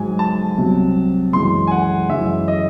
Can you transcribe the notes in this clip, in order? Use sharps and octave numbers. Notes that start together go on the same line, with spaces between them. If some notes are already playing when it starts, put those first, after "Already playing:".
Already playing: G#2 F#3 G#5
A5
C2 C3 F#3
F#2 E3 G#3 C6
G#5
F#5
F#2 E3 G#3 E5
D#5